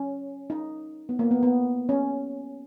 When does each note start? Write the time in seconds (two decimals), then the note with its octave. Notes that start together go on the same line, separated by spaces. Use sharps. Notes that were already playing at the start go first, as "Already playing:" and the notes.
Already playing: C#4
0.50 D#4
1.09 B3
1.19 A#3
1.31 B3
1.43 B3
1.89 C#4